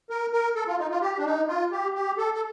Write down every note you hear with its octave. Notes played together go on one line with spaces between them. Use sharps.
A#4
A#4
A4
F4
D#4
F4
G4
D4
D#4
F4
G4
G4
A4
A4